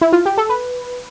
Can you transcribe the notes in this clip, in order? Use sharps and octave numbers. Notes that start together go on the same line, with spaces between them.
E4
F4
G4
A4
B4